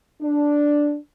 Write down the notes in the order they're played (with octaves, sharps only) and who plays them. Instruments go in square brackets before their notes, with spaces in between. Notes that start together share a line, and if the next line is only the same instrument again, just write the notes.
[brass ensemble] D4